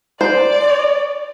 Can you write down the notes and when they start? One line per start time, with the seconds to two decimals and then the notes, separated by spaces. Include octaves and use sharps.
0.21 C5 D5